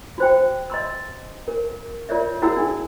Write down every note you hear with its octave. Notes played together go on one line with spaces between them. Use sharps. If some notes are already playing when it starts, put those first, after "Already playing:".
F#4 C5 G5
D#5 C6 E6
A#4
F4 A#4 C#5 D5 E5
E4 F#4 G#4 A#4 F#5 E6
D4 D#4 G#4